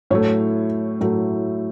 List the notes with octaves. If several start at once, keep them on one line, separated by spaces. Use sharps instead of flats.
A2 F#3 A3 C#5
A2 F#3 A3